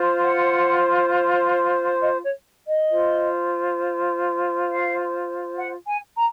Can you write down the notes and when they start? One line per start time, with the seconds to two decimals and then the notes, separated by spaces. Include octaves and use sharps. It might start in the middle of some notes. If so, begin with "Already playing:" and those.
Already playing: F4 C5
0.22 F#5
2.00 D#5
2.23 C#5
2.68 D#5
2.89 F4 C5
4.68 F5
5.57 F#5
5.87 G#5
6.16 A#5